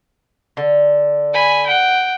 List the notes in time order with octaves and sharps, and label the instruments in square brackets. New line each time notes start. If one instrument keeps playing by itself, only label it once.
[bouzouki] D3
[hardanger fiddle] G#5 B5
F#5 G5